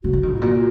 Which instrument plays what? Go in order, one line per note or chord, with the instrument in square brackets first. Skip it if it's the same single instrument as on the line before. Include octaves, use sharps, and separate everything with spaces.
[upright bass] C#3 [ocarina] F#4
[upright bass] F3
D#3
[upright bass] G#2 [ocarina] F4
[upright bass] A#2 [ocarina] F#4